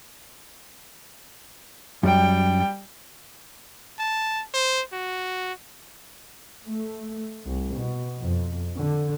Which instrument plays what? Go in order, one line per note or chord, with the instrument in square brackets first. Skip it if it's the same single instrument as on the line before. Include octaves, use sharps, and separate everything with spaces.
[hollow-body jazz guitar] F#2 [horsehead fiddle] G3 G5
[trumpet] A5
C5
F#4
[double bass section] A3
C2
B2
F2
D3